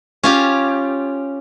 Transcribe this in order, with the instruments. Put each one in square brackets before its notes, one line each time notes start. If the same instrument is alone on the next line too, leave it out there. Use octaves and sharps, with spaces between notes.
[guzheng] C#4 F4 G4